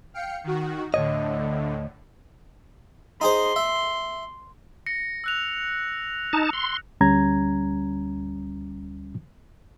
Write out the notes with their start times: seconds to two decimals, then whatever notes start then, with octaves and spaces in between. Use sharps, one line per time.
0.14 F5 G5 C#7
0.44 D#3 F#4
0.94 D2 A2 D3 C#5 D#5
3.21 D#4 G#4 C5 C6
3.56 E5
4.86 A#6 C#7
5.24 E6 F#6 F7
6.33 D#4 A5
6.53 C6
7.01 D2 G3 C#4 A#5 G#6